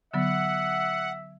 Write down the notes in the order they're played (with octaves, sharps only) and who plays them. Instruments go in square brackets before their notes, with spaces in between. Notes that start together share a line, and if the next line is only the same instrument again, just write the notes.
[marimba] D3 F#3 B3 [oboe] E5 [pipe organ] F#5